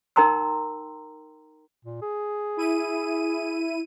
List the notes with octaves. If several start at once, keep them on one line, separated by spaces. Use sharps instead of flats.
D#4 A#4 G5 A#5 C6 E6
A#2
G#4
E4 D#7